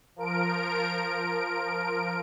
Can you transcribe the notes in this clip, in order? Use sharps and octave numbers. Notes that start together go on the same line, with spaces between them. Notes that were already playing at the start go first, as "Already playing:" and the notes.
F3 A#4 D7